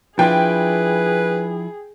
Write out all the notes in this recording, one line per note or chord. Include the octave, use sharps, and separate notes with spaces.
F3 D4 E4 G#4 B4 G5